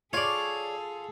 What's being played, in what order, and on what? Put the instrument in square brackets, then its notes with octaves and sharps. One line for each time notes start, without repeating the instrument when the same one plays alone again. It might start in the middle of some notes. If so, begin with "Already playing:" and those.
[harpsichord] F4 [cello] G#4 A4 [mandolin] C#5 D5